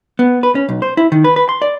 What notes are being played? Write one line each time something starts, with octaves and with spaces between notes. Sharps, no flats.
B3
B4
C#4
B1
C5
E4
D#3
B4
B4
C6
D5